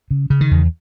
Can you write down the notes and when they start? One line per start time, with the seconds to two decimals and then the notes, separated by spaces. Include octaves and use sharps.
0.11 C#3
0.30 C#3
0.41 D#3
0.51 E2